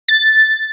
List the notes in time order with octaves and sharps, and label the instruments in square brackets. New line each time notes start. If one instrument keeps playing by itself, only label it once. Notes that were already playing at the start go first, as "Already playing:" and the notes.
[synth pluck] A6